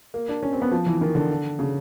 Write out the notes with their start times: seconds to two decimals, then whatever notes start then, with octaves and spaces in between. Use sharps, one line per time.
0.14 A#3
0.29 D4
0.43 C#4
0.53 C4
0.62 B3
0.71 F3
0.86 E3
0.97 E3
1.01 D#3
1.15 D3
1.59 C#3